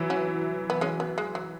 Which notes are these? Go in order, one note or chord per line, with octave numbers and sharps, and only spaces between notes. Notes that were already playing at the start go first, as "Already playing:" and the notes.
Already playing: E3 F#3
C#4 F#4
B3
G#3 C#4
B3
G#3
F#3